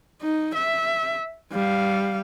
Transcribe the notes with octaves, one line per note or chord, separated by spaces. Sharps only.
D#4
E5
G3 F5